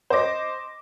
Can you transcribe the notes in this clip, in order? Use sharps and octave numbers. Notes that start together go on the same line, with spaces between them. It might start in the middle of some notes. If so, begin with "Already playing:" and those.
C5 D#5 D6 A#6